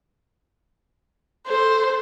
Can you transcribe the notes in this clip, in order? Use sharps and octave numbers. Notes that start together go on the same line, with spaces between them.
A4 C5